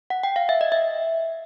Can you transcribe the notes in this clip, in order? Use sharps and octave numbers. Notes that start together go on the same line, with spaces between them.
F#5
G5
F5
E5
D#5
E5